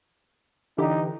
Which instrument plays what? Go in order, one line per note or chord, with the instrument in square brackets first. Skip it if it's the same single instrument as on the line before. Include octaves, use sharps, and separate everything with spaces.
[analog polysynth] D3 E3 G4 [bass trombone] D#4